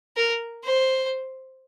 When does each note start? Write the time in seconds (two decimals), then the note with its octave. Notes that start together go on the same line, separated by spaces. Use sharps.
0.16 A#4
0.64 C5